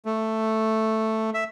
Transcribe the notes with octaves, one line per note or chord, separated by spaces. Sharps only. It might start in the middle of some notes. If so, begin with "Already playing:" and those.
A3
E5